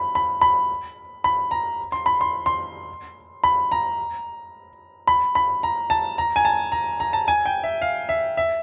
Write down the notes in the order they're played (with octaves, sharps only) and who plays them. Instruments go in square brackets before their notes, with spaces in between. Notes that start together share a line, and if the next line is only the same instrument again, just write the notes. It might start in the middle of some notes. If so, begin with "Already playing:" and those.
Already playing: [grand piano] B5
B5
B5
B5
A#5
C6
B5
C6
C6
B5
A#5
B5
B5
A#5
A5
A#5
G#5
A5
A#5
A#5
A5
G#5
G5
E5
F5
E5
E5